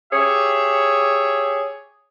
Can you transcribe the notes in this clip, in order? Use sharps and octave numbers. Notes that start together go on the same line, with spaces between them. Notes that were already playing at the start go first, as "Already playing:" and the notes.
G4 G#4 C#5 E5